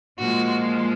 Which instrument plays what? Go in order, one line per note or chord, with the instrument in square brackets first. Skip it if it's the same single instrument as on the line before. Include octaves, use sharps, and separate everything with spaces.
[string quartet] A#2 F3 G#3 F#4